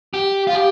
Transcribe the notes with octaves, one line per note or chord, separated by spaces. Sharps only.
G4
F4
G4